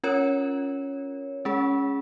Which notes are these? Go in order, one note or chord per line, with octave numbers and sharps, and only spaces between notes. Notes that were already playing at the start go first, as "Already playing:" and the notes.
C#4 F4 A#4 C#5
G#3 C#4 G#4